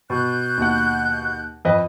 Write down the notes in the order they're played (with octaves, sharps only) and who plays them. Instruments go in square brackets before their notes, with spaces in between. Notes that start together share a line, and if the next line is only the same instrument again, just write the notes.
[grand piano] B2 [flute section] F#6 G6
[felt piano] D#2 F#5
[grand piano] F2 B4 D#5